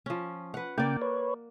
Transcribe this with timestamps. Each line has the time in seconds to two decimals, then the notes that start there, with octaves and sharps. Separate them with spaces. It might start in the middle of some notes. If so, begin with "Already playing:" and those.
0.06 F3 C#4
0.54 B4 F#5
0.78 C#3 A#3 D5 G5
1.02 B4 C#5